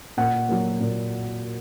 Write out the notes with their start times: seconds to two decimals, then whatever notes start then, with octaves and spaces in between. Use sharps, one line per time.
0.17 A#2 F#5
0.49 F#3 A#3
0.80 A#2